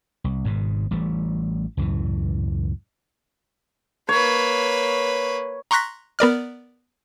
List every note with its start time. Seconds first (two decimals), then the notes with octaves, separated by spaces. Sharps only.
0.24 C2
0.44 G#1 G#2 B2
0.91 A1 E3 G3 A3
1.77 C#2 F#2 A2 E3
4.09 A#3 B4 C#5
5.71 A#5 C6 C#6 F#6 A#6 B6
6.19 B3 A#4 D5 F6